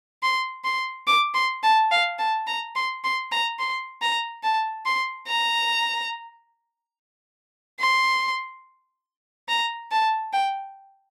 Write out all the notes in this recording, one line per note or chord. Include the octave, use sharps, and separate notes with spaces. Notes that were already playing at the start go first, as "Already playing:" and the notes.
C6
C6
D6
C6
A5
F5
A5
A#5
C6
C6
A#5
C6
A#5
A5
C6
A#5
C6
A#5
A5
G5